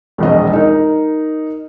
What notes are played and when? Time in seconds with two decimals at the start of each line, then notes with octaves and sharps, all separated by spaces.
0.18 E1 A#1 D#5
0.53 D#4 A#4